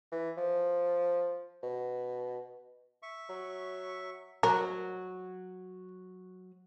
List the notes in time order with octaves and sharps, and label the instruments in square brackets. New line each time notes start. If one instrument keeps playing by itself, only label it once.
[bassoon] E3
F3
B2
[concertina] E5 C#6
[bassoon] F#3
[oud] F#3 [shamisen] A#4